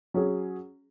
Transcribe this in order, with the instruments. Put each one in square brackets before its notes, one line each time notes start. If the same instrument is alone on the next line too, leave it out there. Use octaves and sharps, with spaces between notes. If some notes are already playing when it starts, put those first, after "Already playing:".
[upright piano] F#3 C#4 G#4